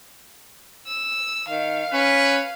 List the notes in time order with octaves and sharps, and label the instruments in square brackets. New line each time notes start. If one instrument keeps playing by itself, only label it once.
[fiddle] E6
[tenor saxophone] D#3 [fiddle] F5
[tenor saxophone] C#4 [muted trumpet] B4